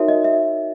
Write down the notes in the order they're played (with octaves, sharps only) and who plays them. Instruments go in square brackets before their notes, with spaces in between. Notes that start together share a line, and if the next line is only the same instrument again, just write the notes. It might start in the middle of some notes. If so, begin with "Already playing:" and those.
Already playing: [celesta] D#4 F#4 A#4 C#5 E5
D#5
E5